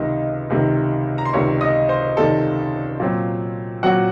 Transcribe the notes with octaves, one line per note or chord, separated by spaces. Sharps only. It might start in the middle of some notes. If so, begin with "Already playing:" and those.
Already playing: C#2 C3 D#3 D#4 D#5
C#2 C3 D#3
A#5
C6
C#2 C3 D#3 C#5 C#6
D#5 D#6
C5 C6
C#2 C3 D#3 A4 A5
A#2 F#3 C4
A#2 F#3 C4 F#4 F#5